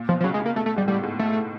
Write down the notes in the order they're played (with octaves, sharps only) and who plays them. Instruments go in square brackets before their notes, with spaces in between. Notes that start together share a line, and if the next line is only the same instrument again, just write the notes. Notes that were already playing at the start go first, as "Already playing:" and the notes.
Already playing: [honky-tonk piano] A#2
[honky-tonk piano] B2 [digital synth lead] F3
[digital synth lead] F3
[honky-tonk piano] C#3 [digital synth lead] F#3
[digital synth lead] G#3
[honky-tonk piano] C#3
[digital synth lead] A#3
[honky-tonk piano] B2 [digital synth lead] A3
[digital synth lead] A3
[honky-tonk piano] G#2 [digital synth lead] G3
[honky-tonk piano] A2 [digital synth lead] G3
[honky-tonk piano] G#2
[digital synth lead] A3